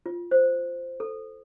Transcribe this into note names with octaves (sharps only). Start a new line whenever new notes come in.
F4
C5
A4